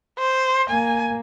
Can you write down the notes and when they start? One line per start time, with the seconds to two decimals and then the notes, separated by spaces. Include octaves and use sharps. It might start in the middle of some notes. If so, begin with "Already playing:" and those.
0.19 C5
0.70 A#3 G#5